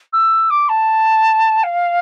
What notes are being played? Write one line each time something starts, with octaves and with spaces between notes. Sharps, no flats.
E6
D6
A5
F5